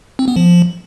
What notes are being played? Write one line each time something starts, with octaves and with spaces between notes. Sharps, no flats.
C4
B3
F3